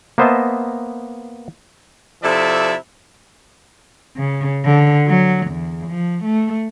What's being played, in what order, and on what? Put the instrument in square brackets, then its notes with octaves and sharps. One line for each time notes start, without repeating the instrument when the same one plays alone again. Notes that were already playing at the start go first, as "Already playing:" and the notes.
[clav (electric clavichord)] A#3 B3 C5 D#5 E5 A5
[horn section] C3 F3 E4 A4 D5 E5
[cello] C#3
D3
F#3
E2
F3
A3